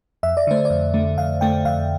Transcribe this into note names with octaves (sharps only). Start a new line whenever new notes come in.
F2 E5
D5
D3 A3 C5
F2 D5
D3 A3
F2 F5
D3 A3 G5
F2 F5